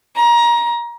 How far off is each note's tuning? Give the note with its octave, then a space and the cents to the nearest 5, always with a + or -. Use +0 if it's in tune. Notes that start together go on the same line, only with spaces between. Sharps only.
A#5 +25